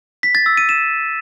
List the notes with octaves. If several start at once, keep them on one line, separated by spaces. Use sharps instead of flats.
B6
A6
E6
D#7
E7